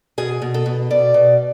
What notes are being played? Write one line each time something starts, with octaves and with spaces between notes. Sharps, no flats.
B2 G#4
B2
A4
B2
B2 D5
B2